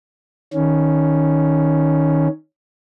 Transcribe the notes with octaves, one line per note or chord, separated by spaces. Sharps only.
D#3 C#4